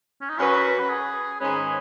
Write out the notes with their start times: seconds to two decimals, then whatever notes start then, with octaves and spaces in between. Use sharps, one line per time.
0.21 C#4
0.29 D#4
0.38 F#2 F#3 C#4 F#4 B4
0.79 B4
0.89 G#4
1.40 G#2 D#3 G#3 C#4 G#4 B4